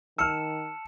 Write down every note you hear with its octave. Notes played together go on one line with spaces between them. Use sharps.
D#3 A5 E6 F6 C#7 E7